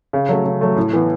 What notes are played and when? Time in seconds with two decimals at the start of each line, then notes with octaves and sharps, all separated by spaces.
0.13 C#3
0.29 F#3 A3
0.45 C#3
0.61 F#3 A3
0.77 A2
0.93 E3 B3